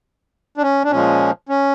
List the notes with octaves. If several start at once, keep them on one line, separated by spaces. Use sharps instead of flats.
D4
C#4
D4
A#2 F3 G#3 C#4
C#4